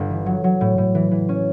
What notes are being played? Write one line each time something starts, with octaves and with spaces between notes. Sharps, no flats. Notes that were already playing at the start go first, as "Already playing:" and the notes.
Already playing: G1
E3
F#3
F#3
A2
A2
E3
E3
C#4